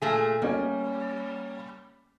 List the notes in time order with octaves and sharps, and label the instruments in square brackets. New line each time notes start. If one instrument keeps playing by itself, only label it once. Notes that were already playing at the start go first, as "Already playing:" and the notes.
[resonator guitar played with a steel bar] A#2 A3 G#4
[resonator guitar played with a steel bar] G3 [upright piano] A#3 C#4